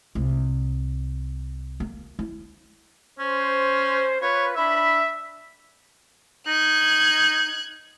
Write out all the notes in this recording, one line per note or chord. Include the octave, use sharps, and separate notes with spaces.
C2
A#3
E4
C#4 C5
F4 B4 C#5
D4 E5 B5
D#4 F#6 G#6